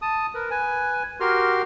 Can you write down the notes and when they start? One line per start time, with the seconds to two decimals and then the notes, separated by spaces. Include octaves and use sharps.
0.02 A5 D#6
0.35 A#4 B4
0.51 B4 G#5
1.20 F#4 G4 A#4 C6 F6